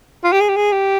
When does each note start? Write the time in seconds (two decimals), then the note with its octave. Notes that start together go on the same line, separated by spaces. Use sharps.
0.24 F4
0.32 G4
0.40 G#4
0.49 G4
0.56 G#4
0.72 G4